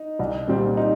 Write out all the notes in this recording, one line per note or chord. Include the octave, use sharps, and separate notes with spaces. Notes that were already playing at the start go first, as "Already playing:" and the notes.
Already playing: D#4
C2
A#2 G3 C4
D#4